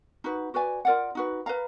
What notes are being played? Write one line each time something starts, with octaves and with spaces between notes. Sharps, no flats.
D#4 F#4 B4
F#4 B4 D5 G#5
F4 A#4 D5 F#5
D#4 F#4 B4
B4 F5 A#5